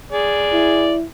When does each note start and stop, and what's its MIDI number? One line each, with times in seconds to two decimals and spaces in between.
0.12 0.93 68
0.12 0.93 74
0.53 1.04 64